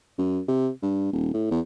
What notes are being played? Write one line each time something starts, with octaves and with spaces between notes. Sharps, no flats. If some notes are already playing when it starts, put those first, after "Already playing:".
F#2
C3
G2
D#1
A2
E2